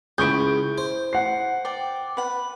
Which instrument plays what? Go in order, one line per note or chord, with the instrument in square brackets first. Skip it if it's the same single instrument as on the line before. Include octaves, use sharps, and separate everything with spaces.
[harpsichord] C#2 [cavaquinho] E4 C#6 D#6 [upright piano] G6 D7
[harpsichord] C5
[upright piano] F#5 C7
[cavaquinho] D5 G5
B4 F#5